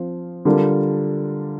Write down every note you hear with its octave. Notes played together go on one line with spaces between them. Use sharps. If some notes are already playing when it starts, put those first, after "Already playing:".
Already playing: F3 C4 F4 C5
D3 G3 D4 F4 A#4